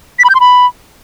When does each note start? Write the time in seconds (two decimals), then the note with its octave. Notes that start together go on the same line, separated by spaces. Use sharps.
0.19 B6
0.24 B5
0.30 G6
0.35 C6
0.40 B5